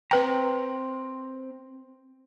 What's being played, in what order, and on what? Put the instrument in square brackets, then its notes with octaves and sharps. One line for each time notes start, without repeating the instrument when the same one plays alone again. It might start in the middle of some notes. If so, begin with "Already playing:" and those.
[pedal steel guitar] C4 A#5 [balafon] B4 G5